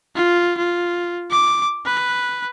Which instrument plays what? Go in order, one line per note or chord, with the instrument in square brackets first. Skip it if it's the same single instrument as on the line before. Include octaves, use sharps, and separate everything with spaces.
[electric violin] F4
F4
D6
B4